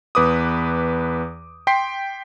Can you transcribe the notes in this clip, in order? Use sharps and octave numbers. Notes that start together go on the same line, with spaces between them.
E2 B4 D6 D#6
G5 C6 B6 C7